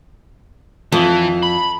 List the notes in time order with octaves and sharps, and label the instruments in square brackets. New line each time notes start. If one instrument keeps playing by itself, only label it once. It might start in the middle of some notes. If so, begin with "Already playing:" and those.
[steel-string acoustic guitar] F2 [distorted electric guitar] E3
[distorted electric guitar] B5